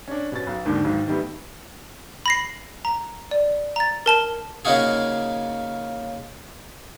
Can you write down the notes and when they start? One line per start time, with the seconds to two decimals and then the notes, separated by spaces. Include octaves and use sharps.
0.08 C#4 D4
0.32 B2 C#4 A6
0.47 B1
0.65 D#2 G#2 D3 D#3
0.84 B1 G#2 D#3
1.08 D#3 G3 A3 B3
2.26 B5 A#6 C7
2.85 A#5
3.31 D5
3.76 A#5 A6
4.06 A#4 A5 G7
4.65 C#3 A#3 D#4 F4 F#4 G#4